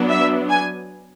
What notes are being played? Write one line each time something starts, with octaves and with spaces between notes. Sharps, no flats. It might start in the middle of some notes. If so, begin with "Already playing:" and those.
Already playing: F#3 B3 D4
E5
G#5